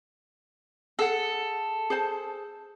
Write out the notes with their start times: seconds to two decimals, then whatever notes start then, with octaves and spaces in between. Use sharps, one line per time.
0.99 G#4 A4 F#5
1.90 G#4 C5 A5